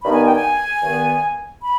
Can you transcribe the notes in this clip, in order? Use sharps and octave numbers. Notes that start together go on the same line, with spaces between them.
G2 D#3 B3 B5
G#5
G5
G#5
G2 D#3 B3
B5